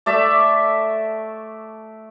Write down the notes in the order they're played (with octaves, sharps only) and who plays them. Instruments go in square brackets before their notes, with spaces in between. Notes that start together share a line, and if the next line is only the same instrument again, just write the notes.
[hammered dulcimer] A3 D5 E5 A5